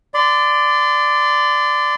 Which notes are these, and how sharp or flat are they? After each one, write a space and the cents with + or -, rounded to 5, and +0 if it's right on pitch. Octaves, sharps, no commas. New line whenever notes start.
D5 +0 C6 -35